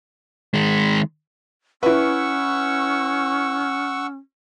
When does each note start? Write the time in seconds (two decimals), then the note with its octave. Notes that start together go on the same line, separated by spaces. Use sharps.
0.54 D#3 G#3
1.83 C#4 E4 B4 F#5 C#6 E6